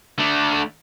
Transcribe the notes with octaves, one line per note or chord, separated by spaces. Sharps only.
D3 A3